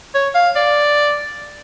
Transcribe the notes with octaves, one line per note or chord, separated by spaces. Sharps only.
C#5
F5
D5